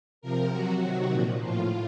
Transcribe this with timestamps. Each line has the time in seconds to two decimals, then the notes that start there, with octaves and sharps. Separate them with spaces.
0.22 C3 F3 A#4
0.51 C3 F#3 F#4
0.82 C3 D#3 F#3
1.11 A#2 F3
1.40 A2 F3 F4